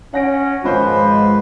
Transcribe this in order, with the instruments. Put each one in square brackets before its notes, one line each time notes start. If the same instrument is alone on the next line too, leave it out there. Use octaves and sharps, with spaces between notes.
[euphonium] C#4 [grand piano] F#5 A#6 D7
[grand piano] G#1 C5 G6 [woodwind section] G#2 F3 G#3 [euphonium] F4 [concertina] B4